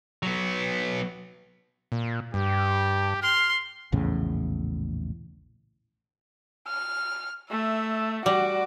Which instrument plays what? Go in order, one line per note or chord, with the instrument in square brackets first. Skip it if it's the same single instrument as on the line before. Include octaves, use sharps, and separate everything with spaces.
[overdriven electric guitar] F#3 B3
[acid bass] A#2
[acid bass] G2 [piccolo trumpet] G4
[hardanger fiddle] C6 [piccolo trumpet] F6
[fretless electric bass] A#1 E2 A2 C#3
[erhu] F6
[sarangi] A3 [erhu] E5
[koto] G3 [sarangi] F#4 [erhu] D6